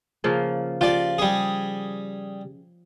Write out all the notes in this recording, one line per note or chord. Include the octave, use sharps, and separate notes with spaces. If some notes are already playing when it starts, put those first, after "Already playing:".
C#3 F3 A#3
F3 F4 G4 D5
G3 G#4